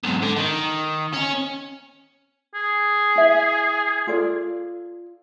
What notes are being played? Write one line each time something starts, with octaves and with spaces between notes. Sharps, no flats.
B1 G#2
D3
D#3
C#4
G#4
E4 E5
F4 A4 D5